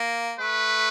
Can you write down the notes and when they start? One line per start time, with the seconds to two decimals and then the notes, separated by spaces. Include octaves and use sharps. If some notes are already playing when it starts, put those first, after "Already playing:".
Already playing: A#3
0.39 A3 B4